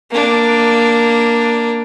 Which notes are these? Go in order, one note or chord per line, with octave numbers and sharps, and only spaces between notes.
A#3 D4